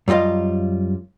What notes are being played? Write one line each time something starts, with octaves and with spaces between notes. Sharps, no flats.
F#2 G3 F4 D#5 F5